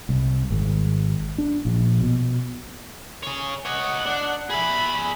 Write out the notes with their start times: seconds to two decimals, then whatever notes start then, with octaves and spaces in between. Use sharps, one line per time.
0.09 C2
0.50 G#1
1.38 D4
1.65 A#1
2.00 B2
3.23 G#4 C#5
3.66 C#5 D#5 F#5
4.06 D4
4.50 G#4 E5 B5